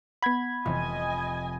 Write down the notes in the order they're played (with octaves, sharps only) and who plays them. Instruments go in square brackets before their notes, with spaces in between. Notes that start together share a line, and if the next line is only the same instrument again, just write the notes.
[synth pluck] B3 F#5 [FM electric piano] B5 G#6
[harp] F1 [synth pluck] C3 E3 F3 [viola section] D#5 G#5